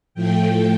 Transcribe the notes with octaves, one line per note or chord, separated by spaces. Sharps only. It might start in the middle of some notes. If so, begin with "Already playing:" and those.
A2 F3 A3 G5